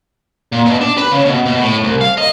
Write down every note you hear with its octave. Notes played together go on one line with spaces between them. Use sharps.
A#2
B2
D4
B4
C#3
B2
B2
A2
C2
F5
D#5